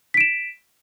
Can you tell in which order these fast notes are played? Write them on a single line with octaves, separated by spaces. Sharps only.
B6 D7 E7